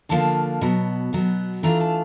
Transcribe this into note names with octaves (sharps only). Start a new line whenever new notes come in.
D3 F3 A#3 D4 A5
B2 F#3 B3
B2 F#3 B3
E3 A3 D4 F4 A#5
A5